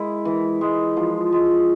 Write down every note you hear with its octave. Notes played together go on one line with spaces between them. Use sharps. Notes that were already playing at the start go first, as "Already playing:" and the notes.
Already playing: G#3 E4
E3
G#3
F3
G#3